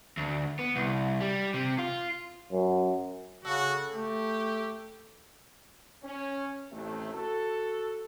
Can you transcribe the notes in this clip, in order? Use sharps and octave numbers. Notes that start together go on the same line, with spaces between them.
D2
B3
C2
G3
C3
F4
F#2
C#3 F#4 A4
A3 G4
C#4
A1 D#2 C3 A3
F#4 A4